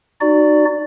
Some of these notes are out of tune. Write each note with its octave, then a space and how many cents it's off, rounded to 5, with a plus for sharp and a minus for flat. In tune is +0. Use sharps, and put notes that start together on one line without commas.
D#4 -30 F#4 +10 D5 +0